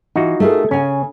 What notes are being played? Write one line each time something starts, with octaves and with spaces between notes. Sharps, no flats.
E3 D#4 F4 F#4
A3 G#4 A#4
C#3 C#4 G#5